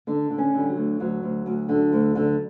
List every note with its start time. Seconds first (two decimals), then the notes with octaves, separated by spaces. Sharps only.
0.07 D3 D4
0.30 D3
0.38 C#4
0.54 D3 G3
0.69 F#3
0.77 D2
1.00 D2 F#3
1.23 D2
1.46 D2
1.69 D3
1.92 D2
2.15 D3